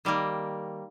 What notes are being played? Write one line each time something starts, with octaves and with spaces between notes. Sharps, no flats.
D#3 G3 A#3